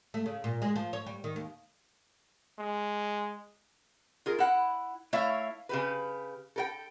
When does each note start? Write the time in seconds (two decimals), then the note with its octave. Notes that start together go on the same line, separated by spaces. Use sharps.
0.14 A3
0.26 C#3
0.44 A#2
0.62 G#3
0.76 F3
0.93 C#5
1.06 G3
1.24 D#3
1.36 D#2
2.59 G#3
4.26 F4 G#4 A#4
4.39 E4 F#5
5.13 A3 E4 C#5 E5 F5
5.69 C#3 G4 B4
6.56 A4 A#4 G5